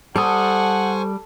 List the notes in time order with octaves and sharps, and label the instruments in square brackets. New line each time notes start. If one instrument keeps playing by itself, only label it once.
[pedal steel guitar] G3 D#6 [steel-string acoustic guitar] A4 [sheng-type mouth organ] C5 G#5 C#6 [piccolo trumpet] F#5